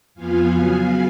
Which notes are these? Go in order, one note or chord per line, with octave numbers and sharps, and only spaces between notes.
F2 F3 B3 F4 F5 G#5
C#3 F#3 B3 F5 G#5